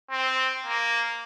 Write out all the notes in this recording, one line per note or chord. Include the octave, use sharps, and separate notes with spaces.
C4
A#3